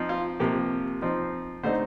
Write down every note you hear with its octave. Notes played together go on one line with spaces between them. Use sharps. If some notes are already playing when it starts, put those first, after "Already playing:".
Already playing: F3 C4 D#4
F4
C3 F3 A#3 G4
F3 C4 D#4
D3 A3 C4 D#4 C5